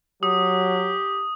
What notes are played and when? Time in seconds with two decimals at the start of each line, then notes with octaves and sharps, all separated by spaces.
0.23 F#3 G4 D#6